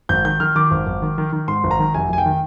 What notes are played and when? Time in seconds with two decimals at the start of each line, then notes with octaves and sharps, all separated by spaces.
0.09 G#1 G6
0.25 D#3 G6
0.40 D#3 F6
0.56 D#3 D6
0.71 G#1
0.87 G#1
1.02 D#3
1.18 D#3
1.33 D#3
1.48 G#2 C6
1.64 G#1
1.71 A#5
1.79 D#3
1.94 F1 G#5
2.09 F1 G#5
2.18 G5
2.26 D#3